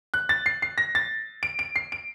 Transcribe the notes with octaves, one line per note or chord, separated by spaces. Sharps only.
F#6
A6
C7
C7
A#6
A6
D7
D7
C7
D7